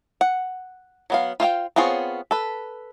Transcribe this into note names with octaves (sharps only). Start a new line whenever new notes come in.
F#5
F#3 B3 F5
F4 C5 F5 G5
B3 C4 F4 G#4 C#5
A4 B4